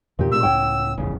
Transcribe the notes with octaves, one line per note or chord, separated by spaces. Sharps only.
E2 A#2 D#3 G4
B2 G#3 D4 E6
C#2 A2 C#5 F#5 G5
D#1 A1 F2 C#3